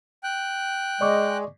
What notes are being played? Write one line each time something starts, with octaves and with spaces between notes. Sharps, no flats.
G5 F#6
G#3 D5 C#6 D6